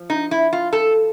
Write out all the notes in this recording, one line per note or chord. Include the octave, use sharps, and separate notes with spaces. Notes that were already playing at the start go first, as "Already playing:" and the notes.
Already playing: F3
D#4
E4
F4
A4